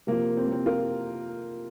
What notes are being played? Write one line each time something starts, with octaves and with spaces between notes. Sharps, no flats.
C3 F3 A#3
C4
A#3
C4
F4 A#4